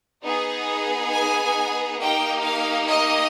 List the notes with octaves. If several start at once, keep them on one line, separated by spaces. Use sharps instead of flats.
B3 D#4 G#4
G#5
A#3 D#4 G4 G5
F5
D#5